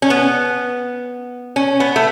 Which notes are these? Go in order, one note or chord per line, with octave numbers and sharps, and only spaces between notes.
C#4
B3
C#4
B3
A3